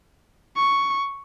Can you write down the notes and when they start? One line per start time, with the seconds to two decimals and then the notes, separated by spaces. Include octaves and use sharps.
0.56 C#6